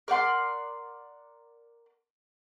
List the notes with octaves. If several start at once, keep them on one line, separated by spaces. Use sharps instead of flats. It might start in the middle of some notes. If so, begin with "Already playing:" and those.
A#4 D5 F#5 C6